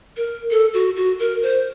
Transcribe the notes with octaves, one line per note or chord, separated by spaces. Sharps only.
A#4
A4
F#4
F#4
A#4
C5